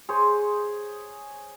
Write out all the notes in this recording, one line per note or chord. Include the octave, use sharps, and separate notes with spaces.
G#4 C5 C#5